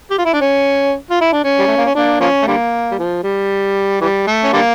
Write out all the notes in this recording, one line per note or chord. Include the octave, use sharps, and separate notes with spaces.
G4
F4
E4
D4
C#4
F4
E4
D4
C#4
G3
A3
A#3
C#4
A#3 D4
F3 A#3 C#4
A3
D3 G3 A#3
G3
F3
G3
E3 G3
A3
C#4
D3 G3 A#3